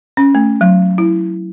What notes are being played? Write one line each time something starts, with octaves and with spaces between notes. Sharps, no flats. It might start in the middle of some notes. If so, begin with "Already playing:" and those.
C#4
A3
F#3
E4